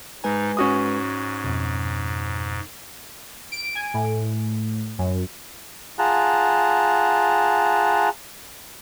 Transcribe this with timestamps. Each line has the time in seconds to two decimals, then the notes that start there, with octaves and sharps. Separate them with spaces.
0.24 G#2 G#3 D#4 B4 G#5
0.57 G#2 C#4 F#4 D#6
1.44 F2 B2
3.52 D7
3.75 G#5
3.94 A2
4.99 F#2
5.99 F4 G#4 F#5 A5 A#5